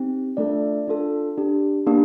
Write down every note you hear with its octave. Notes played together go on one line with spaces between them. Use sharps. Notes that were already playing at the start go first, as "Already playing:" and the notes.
Already playing: C4 D#4 G4
A3 D4 F4 A4 D5
D4 F4 A4
D4 G4
A#3 D4 G4